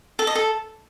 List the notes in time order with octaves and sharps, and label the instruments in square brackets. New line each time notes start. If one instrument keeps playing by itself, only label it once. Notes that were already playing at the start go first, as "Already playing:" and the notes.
[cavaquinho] A4
D#5
A4